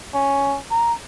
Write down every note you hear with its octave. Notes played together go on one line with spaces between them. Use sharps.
C#4
A#5